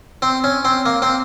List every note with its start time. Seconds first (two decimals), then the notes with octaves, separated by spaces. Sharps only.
0.22 C4
0.44 C#4
0.65 C4
0.86 A#3
1.02 C4